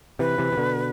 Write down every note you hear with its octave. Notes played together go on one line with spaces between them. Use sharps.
C3 E3 B4
C3 E3
C3
B2 D3